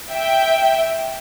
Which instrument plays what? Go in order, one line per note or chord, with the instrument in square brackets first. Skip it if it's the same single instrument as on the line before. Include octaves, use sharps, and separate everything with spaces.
[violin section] E5 G5